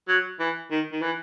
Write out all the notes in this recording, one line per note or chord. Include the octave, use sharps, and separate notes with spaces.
F#3
E3
D#3
D#3
E3